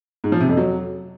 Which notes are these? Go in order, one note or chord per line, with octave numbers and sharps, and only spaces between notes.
G#2
F3
C3
F2
F#3